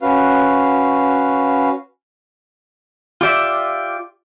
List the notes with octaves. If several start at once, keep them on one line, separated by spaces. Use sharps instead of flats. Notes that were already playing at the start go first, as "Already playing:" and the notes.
C#4 F#4 B4 F5
F4 G4 D5 E5